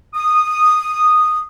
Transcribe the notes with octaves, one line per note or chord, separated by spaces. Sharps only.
D#6